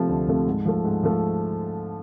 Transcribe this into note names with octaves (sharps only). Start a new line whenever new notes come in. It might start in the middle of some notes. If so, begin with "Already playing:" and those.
Already playing: C3 F3 A3
D2
C3 F3 A3
G#2
F3 A3
G#2
F3 A3